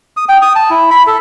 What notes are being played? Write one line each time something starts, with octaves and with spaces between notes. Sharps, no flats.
D#6
G5
D#6
A5
E4
B5
A4